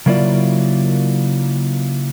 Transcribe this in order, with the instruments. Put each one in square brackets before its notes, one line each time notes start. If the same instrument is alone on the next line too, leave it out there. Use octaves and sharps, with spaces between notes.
[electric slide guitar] C#3 F#3 A#3 E4 F4 D5